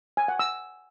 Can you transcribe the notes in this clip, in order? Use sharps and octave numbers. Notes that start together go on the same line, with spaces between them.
G#5
F#5
E6